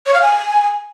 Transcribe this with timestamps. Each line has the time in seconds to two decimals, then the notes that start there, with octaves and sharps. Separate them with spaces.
0.06 C#5
0.14 F5
0.22 G#5